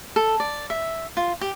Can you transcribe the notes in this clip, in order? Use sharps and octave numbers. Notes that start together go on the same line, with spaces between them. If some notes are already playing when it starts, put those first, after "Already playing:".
A4
D5
E5
F4
G4